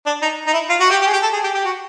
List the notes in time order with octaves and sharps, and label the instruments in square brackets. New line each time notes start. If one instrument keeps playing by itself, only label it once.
[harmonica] D4
D#4
D#4
E4
F4
F#4
G4
G4
G#4
G4
A4
G#4
G4
G4
F#4